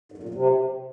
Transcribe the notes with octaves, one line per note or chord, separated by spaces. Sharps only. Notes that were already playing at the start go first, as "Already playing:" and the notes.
G#2
F#2
A#2
F#2
C3